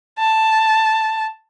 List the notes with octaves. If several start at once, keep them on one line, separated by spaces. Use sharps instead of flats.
A5